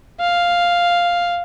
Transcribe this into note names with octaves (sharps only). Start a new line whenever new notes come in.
F5